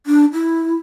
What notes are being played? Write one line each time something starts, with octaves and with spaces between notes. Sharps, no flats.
D4
E4